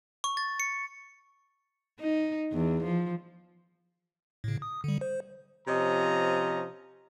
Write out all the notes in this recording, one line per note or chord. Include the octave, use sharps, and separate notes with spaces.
C#6
A6
C#7
D#4
E2
F3
A2 C#3
D#6
D3 G3
C5
C3 F3 C#4 D#5 A#5